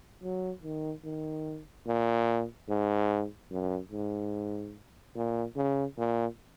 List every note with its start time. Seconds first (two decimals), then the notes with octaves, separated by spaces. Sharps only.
0.22 F#3
0.63 D#3
1.04 D#3
1.86 A#2
2.68 G#2
3.50 F#2
3.92 G#2
5.15 A#2
5.56 C#3
5.97 A#2